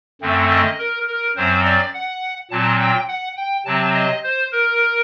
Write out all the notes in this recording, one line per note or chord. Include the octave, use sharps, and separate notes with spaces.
F#2 D3 A3 C4
D#5
A#4
A#4
F#2 F#3 C4 C5
D5
F#5
A#2 F#3 C4 A5
G5
F#5
G5
C3 F#3 C4 A5
D#5
C5
A#4